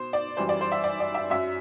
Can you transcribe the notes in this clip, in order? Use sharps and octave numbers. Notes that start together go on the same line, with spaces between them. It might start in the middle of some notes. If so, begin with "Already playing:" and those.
Already playing: B2 C5
D5
F#2 E3 G3 C5
D5
C5
E5
D5
D5
E5
F#2 F#3 E5